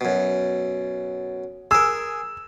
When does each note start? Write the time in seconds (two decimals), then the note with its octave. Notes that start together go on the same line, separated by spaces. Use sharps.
0.01 F#2 B2
1.71 G#4 A#4 E6